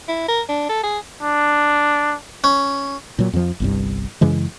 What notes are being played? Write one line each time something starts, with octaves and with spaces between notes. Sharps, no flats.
E4
A#4
D4
A4
G#4
D4
C#4
A#2 F#3
F2 F3
G1 C2 G2
F#2 C#3 E3 G#3